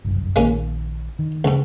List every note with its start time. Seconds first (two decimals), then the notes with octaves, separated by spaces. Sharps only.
0.05 G1 C2 F#2
0.36 A#1 D#3 G#3 A#3 C#4
1.19 D#3
1.44 C#2 G#2